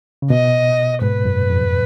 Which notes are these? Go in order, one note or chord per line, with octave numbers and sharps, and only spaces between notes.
C#3
B2 D#5
G#2 B4
F#2
F2